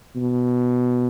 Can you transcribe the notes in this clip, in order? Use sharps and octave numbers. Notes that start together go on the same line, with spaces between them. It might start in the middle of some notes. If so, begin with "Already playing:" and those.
B2